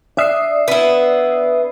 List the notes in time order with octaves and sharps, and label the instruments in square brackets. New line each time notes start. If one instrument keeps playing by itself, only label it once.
[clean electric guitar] D4 E5 [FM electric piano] D5 D#6 C7
[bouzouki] B3 E4